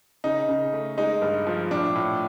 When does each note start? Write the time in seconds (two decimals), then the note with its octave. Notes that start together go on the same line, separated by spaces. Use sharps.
0.24 C#3 D#4
0.48 C#3
0.73 A3
0.97 G#3 D#4
1.22 G2
1.47 F3
1.71 A2 D4
1.95 A2